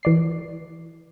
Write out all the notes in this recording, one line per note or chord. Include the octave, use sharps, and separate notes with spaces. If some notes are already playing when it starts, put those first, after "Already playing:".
E3 D5 C7